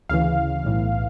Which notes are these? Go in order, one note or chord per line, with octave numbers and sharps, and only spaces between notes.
D2 C#3 E3 F5
B1 A2 E3